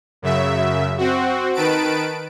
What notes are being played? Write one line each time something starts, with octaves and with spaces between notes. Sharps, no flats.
F#2 C#3 E5
C4 F#4
D#3 B4 A5 D7